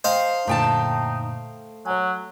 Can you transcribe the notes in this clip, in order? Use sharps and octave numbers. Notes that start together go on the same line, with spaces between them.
C5 D#5 F5 G5 A5
F#2 A#2 D3 A3 D#4 G5 A5
F#3 C#5 G#5